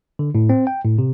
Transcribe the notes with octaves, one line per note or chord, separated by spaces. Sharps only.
D3
A2
C4
G5
A2
C3